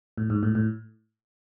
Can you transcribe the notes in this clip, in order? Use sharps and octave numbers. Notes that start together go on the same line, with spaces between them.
A2
G#2
A2
A2